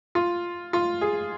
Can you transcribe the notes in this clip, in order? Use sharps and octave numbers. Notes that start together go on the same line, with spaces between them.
F4
F4
G#4